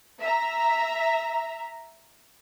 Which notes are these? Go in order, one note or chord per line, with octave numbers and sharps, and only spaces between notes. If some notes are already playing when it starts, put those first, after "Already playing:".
E5 A#5